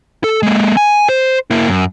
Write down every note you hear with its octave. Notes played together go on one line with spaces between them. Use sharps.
A4
G#3 A#3
G#5
C5
A#3 E4
F#2